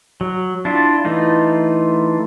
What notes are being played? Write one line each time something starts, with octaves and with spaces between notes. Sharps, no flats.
F#3
D4 E4 F4
E3 A3 D#4 F4